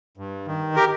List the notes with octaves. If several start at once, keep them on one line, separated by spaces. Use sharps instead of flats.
G2
D#3
G4 A#4